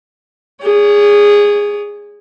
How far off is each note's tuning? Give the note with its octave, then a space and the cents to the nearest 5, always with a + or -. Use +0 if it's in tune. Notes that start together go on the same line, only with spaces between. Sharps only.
G#4 -15 C#5 +35